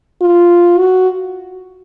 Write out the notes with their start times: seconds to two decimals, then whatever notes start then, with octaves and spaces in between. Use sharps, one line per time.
0.22 F4
0.79 F#4